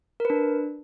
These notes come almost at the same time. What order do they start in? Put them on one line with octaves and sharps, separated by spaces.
A#4 B4 D4